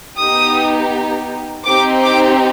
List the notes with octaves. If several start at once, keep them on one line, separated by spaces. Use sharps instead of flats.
B3 D#4 G4 D#6
C4 D#4 G4 D6
D6